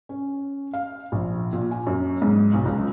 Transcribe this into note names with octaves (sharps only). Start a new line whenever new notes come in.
C#4
F5
A#1
A#2
G#5
F#2
G#2
B1
C#2